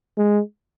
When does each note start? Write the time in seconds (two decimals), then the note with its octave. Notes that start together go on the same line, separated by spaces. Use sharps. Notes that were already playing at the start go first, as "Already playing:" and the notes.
0.18 G#3